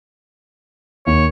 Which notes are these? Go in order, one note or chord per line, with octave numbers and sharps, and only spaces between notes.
D#2 C#5